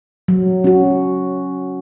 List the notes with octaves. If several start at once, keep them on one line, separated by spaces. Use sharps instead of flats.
F#3
C#4 F#4